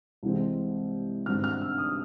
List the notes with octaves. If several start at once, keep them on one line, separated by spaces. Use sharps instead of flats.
C2 C3 E3 G#3 C4
G#1 G2 D3 G3 C4 F6
F6
E6
D#6